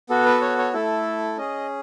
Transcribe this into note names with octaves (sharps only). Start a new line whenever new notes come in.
B3 F#4 A4
B4
C#5
C#5
A3 E4 A4
C#4 G#4 D#5